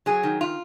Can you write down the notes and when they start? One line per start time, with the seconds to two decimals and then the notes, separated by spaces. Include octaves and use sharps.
0.06 F#3 G#4
0.23 D#3
0.41 F4